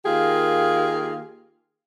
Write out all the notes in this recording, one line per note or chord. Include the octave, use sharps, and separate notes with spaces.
D#3 A#3 F4 G4 G#4